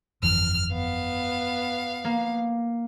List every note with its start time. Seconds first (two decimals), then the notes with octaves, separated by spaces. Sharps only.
0.23 G1 F2 E3 F6
0.73 B3 F5
2.05 A#3